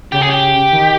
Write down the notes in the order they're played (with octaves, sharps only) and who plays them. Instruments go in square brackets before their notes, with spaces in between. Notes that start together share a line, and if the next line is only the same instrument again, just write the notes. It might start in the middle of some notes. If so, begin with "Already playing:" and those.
[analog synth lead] C#3 [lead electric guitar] G4
[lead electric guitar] G#4
G4
[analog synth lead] D#3